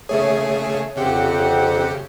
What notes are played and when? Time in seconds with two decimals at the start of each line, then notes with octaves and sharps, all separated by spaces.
0.09 C#3 A3 G#4 C#5 E5
0.97 F2 C#3 C4 G4 F#5